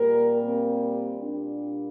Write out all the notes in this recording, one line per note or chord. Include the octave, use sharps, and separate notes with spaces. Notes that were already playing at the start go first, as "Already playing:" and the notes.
Already playing: A#2 G3 A#3 A#4
C4
A#2 G3 A#3 D4